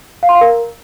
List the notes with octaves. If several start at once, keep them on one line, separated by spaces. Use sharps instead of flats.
F5
C6
F5
A#4